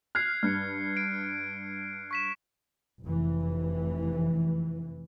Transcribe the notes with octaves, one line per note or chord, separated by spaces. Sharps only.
F6 F#6 G#6 C7
G2 F6 F#6 C#7
D7
C#6 B6 E7
F1 E3